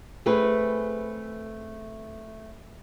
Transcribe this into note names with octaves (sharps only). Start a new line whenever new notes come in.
A3 C4 G#4 B4